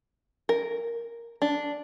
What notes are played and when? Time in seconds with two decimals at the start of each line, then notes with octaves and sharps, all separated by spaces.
0.49 A#4
1.42 D4